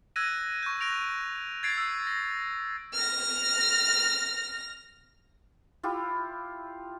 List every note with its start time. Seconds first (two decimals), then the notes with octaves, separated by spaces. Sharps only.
0.16 E6 F#6 G#6 A#6 D#7
0.63 C#6 G6
0.81 F#6 A#6 D7 F7
1.63 G#6 A6 C7 D7
1.78 E6 C7
2.07 A#6
2.94 F6 A#6
5.83 E4 F4 G4